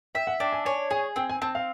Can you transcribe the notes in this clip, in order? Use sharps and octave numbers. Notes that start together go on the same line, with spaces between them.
E5 G5
F#5
D4 G5
G#5
C#5 G#5
G#4 G#5
C4 G5
G#5
C4 A5
F5